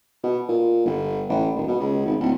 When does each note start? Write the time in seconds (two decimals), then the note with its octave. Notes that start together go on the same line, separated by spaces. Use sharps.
0.23 B2
0.49 A#2
0.86 G1
1.29 A1
1.56 D#1
1.68 B2
1.80 C#2
2.06 G#1
2.20 D1